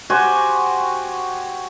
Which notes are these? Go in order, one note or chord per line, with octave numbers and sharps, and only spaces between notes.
F#4 G4 C5 G#5